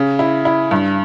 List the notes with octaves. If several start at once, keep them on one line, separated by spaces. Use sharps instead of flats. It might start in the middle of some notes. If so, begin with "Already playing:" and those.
Already playing: C#3
E4
E4
G2